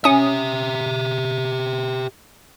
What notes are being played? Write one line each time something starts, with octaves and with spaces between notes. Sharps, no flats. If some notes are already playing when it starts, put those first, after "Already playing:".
C#4 G4 E5 D#6